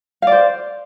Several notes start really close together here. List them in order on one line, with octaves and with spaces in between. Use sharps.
F5 D5 C5